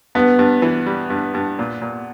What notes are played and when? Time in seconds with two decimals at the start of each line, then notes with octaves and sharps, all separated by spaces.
0.15 G2 B3
0.39 G2
0.62 E3
0.86 G3
1.10 G2
1.35 G2
1.59 A#2
1.82 A#2